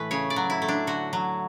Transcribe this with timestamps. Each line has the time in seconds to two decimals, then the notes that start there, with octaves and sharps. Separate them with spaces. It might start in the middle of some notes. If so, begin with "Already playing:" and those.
Already playing: A2 E3 A3 B4
0.11 C#3 C#5
0.30 D5
0.36 F#3
0.50 E4
0.62 A3
0.68 D4
0.87 D3 F#4
1.13 F#3